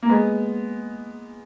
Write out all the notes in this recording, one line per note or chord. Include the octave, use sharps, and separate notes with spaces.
A#3
G#3 B3